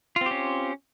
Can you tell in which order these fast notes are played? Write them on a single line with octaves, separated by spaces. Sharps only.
F4 C4 G4 C#4